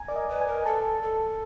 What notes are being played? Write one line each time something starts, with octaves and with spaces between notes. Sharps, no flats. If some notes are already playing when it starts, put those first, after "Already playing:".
Already playing: G#5 A#5
A#4 D5
D#5
B4
G#5
A#4
A4 A5
A4